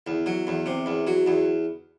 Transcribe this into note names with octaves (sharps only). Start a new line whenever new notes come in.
E2
F#3
E2
C3
E2
F#3
E2